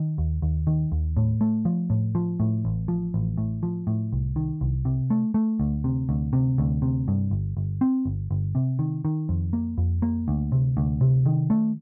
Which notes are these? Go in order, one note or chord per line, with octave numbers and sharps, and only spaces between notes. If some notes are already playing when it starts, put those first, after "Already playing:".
Already playing: D#3
D#2
D#2
D#3
D#2
A2
A3
F3
A2
F3
A2
A1
F3
A1
A2
F3
A2
C2
D#3
C2
C3
A3
A3
D2
C3
D2
C3
D2
C3
G2
G1
G1
C4
G1
G1
C3
D#3
D#3
F2
A#3
F2
A#3
D2
C3
D2
C3
D#3
A3